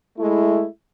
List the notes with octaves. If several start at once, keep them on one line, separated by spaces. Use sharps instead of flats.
G#3 A3 E4